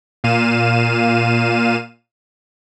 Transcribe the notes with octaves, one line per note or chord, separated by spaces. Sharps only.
A#2 F5 D#7 E7